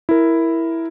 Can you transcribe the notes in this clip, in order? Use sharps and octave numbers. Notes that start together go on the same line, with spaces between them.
E4 A#4